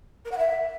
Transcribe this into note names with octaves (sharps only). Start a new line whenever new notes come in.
A#4
F#5
E5